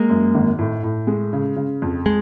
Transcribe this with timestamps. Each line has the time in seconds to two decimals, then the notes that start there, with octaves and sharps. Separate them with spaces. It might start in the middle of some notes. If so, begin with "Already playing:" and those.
Already playing: G#3 A#3
0.09 F#2
0.34 G#1
0.58 A2
0.83 A2
1.07 G#3
1.33 C#3
1.56 C#3
1.82 F2
2.06 G#3